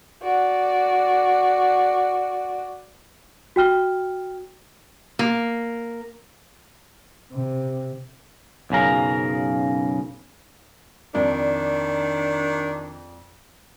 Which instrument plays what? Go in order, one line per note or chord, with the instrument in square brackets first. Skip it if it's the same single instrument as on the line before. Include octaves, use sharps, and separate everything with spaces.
[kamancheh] F#4 D5
[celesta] F#4 G5 F6 G7
[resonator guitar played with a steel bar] A#3
[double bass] C3
[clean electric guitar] B1 F#2 C#3 A#4
[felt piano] F2 D5 [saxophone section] D#3 D4